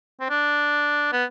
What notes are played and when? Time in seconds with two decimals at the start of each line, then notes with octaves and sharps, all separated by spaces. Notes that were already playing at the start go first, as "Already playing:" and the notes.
0.20 C4
0.30 D4
1.12 B3